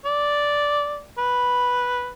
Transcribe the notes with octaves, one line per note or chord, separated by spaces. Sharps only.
D5
B4